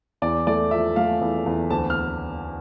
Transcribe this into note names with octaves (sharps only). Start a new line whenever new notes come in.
E2 D5
A3 D5
F3 E5
A3 F5
E2
E2
D2 A5
F6